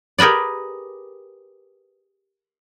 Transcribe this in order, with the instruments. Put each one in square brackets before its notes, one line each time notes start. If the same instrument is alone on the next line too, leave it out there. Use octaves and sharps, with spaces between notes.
[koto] G4 G#4 A#4 B4 D5